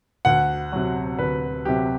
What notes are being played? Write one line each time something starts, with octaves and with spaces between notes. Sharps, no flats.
D2 F#5
C3 F#3
D2 B4
C3 F#3 G4